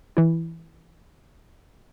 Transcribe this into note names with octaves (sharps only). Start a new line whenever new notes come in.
E3 E4